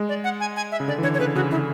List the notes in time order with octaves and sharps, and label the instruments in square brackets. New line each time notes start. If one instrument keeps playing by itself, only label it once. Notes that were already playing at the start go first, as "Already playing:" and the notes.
Already playing: [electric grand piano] G#3
[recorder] D5
F#5
G#5
G#5
E5
[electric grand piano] C#3
[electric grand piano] D3 [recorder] D5
[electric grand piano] E3
[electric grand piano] D3 [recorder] C#5
[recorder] C#5
[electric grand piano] C#3 [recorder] B4
[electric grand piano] C#3 [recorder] F#4
[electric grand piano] D3 [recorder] E4